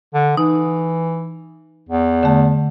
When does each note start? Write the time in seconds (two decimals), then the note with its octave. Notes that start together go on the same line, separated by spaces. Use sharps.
0.14 D3
0.37 E3 D#4
1.89 E2
2.23 D3 A3